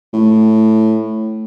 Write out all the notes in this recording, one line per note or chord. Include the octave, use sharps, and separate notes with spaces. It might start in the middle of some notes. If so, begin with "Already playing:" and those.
A2